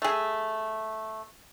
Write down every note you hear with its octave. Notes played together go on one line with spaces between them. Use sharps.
A3 G#4